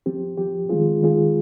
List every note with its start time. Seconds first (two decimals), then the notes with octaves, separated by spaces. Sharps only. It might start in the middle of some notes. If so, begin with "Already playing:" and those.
0.06 F3 C4 G4
0.37 F3 C4 G4
0.69 D#3 G#3 C4 F4 G#4
1.01 D#3 G#3 C4 F4 G#4